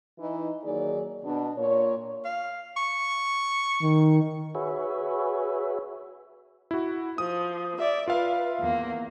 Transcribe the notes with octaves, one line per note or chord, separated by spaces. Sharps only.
E3 D#4
D#3 F#3 A#3 D#4 G#4 D5
B2 D4
A#2 C#5
F5
C#6
D#3
F#4 G#4 B4 C#5 E5
E4 F#4
F3 D#6
D5 E5
F4 B4 E5 F5
E2 A#3